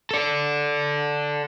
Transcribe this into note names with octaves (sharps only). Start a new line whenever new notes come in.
A4 D5